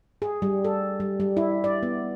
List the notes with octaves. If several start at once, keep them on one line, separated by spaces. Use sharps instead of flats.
G#4
G3
A4
G3
G3
E4
D5
B3